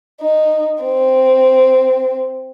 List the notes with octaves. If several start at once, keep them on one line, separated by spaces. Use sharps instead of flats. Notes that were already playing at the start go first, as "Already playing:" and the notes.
D#4
C4